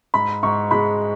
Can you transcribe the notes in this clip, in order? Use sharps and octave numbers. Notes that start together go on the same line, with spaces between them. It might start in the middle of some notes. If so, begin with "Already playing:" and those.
G#2 B5
G#2 C#6
G#3 B5